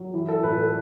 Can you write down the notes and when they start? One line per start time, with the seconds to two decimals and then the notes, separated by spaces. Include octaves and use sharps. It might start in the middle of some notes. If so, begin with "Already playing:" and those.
Already playing: F#3
0.14 E3
0.28 A4
0.43 A2 B4
0.58 A4